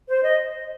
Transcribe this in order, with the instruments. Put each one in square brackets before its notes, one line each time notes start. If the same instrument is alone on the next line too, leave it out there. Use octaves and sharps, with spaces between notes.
[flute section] C5
D#5